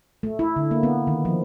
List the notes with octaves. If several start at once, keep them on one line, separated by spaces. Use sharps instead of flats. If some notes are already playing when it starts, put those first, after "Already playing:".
A3
E4
D3
A#3
B3
D#3
F3